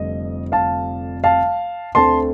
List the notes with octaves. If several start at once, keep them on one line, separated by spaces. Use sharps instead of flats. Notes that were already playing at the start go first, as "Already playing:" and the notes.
Already playing: F1 F2 D3 G3 D#5
F5 A5
F5 A5
D2 D3 A3 C4 A5 C6